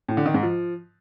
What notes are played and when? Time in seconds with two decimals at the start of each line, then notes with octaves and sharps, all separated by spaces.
0.08 A2
0.17 D3
0.26 D#3
0.34 G#2
0.43 F3